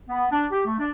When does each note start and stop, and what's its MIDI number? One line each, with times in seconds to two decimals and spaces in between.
0.09 0.27 59
0.32 0.45 62
0.51 0.62 67
0.66 0.79 57
0.79 0.90 62